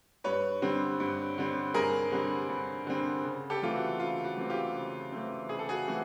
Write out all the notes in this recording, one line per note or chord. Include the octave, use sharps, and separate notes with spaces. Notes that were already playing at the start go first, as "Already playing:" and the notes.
G2 B4 C#5
D3 G3 C4
G2
D3 G3 C4
G2 G#4 A#4
D3 G3 C4
G2
D3 G3 C4
C#3
G4 A4
E3 A3 C4 F4
F#4
C#3 F4
F#4
E3 A3 C4
F4 G4
C#3
E3 A3 C4
C#3 G#4
A4
F#4 G#4
E3 A3 C4 F#4